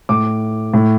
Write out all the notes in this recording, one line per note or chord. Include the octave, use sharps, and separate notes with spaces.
A2 D6
A2